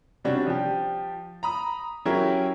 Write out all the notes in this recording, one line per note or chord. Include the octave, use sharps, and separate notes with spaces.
C3 G3 C#4 D4 F#4
F3 G4
A#5 B5 D#6
F#3 C#4 E4 G4 G#4 A#4